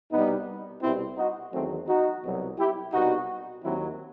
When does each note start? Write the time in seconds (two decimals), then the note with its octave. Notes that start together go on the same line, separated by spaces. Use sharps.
0.12 C2 B2 G3 B3 D#4
0.83 C2 B2 G3 C4 E4
1.17 D#4 F#4
1.53 E2 D#3 F#3 A3 C4
1.88 D#4 F#4
2.23 C2 B2 F#3
2.58 E4 G4
2.93 C2 B2 G3 D#4 F#4
3.64 D#2 D#3 F#3 C4 E4